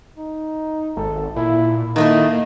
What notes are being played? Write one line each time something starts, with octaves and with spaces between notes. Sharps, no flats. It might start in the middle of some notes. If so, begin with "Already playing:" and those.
D#4
G#1 A4
A#2 E4
D#3 A3 A#3 E4 D#5